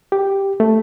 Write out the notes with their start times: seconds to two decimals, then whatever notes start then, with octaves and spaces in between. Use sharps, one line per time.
0.12 G4
0.60 A3